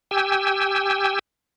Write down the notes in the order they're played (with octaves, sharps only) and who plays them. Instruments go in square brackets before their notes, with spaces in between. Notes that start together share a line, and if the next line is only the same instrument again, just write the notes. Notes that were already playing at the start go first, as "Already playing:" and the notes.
[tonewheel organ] G4 G5 G#5 E6